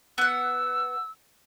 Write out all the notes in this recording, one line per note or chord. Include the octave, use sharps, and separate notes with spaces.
B3 F#5 E6